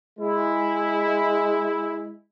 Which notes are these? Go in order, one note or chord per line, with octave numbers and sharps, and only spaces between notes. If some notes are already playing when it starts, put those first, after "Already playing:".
G#3 E4